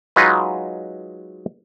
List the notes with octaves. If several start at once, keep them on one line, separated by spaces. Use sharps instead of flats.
F#3 G#3 D#4 F4 B4